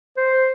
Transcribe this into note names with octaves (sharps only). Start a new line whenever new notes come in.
C5